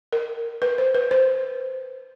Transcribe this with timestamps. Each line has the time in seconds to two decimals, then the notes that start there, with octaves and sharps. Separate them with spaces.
0.13 A#4
0.62 B4
0.78 C5
0.95 B4
1.11 C5